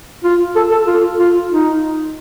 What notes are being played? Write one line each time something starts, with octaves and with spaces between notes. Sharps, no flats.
F4
A4
A4
F4
F4
D#4